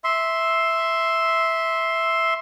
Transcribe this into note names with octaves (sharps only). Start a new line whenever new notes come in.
E5 C6